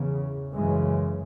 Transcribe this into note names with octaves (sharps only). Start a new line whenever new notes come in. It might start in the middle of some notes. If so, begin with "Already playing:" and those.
Already playing: E2 C#3
F#2 C#3 E3 G#3